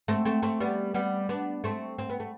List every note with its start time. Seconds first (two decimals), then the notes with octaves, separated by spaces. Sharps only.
0.08 A3 C4
0.25 A3 C4
0.43 A3 C4
0.60 G3 B3
0.94 G3 B3
1.29 B3 D4
1.64 A3 C4
1.98 C4
2.10 B3
2.20 A3